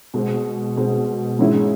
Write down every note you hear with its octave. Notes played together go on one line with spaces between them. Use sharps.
B2 G#3 C4
B2 G#3 C4
G#2 E3 G#3 C#4 E4